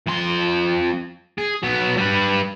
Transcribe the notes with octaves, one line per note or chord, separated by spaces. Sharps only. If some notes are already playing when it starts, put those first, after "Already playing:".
F2 C6
G#4
F#3 B3
G3 B4